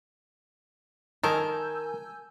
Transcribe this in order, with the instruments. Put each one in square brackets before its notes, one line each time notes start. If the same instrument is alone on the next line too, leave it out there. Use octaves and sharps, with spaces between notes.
[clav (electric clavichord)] D#3 [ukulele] A#4 [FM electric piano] G#5 E6 G6 [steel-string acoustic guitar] A5